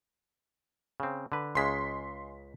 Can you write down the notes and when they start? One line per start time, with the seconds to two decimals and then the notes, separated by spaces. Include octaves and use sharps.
1.00 C#3 C4
1.32 D3 B4
1.55 C#2 C#3 G#3 C6 B6